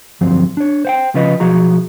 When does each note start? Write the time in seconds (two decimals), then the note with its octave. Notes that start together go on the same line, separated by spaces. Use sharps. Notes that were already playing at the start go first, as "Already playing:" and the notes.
0.21 D2 G2 F3 F#3 C4
0.57 D4 C#5
0.85 C5 F#5 G5
1.14 C#3 F3 C#4 F4 B4 D#5
1.40 B1 F3 F#4 G#4 A#5